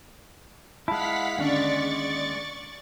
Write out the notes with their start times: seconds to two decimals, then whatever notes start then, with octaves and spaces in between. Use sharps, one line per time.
0.88 G#3 E4 F5 F#5 A5 B6
1.39 D#2 D3 G#3 C#4 D4 D5 C#6 A6